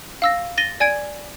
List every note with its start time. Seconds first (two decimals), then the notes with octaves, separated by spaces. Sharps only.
0.22 F5 E6 A#6
0.58 A6 A#6 D#7 G7
0.80 D5 G#5 G#6 D7